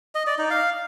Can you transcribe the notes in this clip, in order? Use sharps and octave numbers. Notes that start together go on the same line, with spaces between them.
D#5
D5
D#4
F5